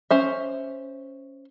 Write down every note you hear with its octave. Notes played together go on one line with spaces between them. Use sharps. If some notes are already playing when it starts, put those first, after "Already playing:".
C#4 C5 E5